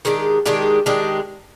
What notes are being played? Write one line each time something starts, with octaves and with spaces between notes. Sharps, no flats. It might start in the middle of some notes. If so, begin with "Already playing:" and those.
D#3 G#3 D4 G4
D#3 G#3 D4 G4
D#3 G#3 D4 G4